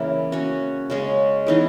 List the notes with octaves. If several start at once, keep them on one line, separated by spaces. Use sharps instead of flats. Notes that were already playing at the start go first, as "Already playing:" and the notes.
Already playing: C#3 E3 A#3 E4
C#4 F#4 C#5
C#3 G#3 C#4
E3 B3 D#4 G#4